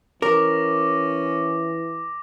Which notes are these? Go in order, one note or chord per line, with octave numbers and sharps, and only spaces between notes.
E3 C#4 A#4 D6 A#6 F7